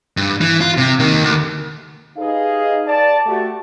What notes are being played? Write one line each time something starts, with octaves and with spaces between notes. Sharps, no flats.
G2
E3
F4
C3
D#3 A#3
D2
D#4 G4 G#4 B4 D#5 F5
D5 A5
A3 F#4 G4